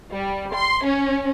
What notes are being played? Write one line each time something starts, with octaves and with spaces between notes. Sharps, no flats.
G3
C6
C#4